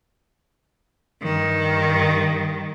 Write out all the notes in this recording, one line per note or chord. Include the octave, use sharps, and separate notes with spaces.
G2 D#3